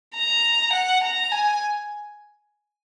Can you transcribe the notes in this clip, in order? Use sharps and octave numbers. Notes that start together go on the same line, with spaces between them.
A#5
F#5
A#5
G#5